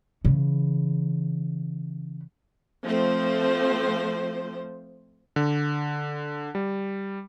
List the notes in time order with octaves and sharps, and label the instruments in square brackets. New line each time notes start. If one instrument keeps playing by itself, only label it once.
[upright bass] C#3 E3
[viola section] F3 A3 C4 C5
[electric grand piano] D3
G3